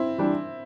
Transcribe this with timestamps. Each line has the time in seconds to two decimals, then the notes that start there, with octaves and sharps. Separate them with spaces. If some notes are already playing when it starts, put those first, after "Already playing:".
Already playing: C4 E4
0.18 E3 G3 D4